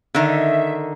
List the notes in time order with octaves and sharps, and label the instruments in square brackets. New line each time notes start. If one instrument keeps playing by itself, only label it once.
[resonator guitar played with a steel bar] D3 D#3 D#4 [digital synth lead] E5